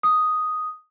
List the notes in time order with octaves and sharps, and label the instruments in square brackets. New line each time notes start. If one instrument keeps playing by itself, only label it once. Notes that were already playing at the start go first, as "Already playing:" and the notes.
[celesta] D#6